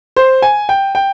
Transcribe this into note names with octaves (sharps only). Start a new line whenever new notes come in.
C5
G#5
G5
G5